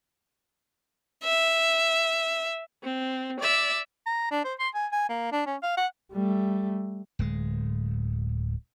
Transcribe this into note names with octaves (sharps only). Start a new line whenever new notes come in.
E5
C4
D5 E5
A#5
D4
C5
C6
G#5
G#5
A#3
D4
C#4
F5
F#5
G3 A3
D1 G#3